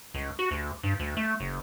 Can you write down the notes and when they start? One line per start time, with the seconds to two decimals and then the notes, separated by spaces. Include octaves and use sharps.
0.14 C#2
0.39 F#4
0.51 D2
0.83 G2
1.00 D2
1.17 A3
1.40 F#1